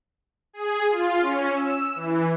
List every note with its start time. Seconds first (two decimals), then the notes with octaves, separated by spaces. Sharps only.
0.53 G#4
0.89 F4
1.21 C#4
1.52 E6
1.95 E3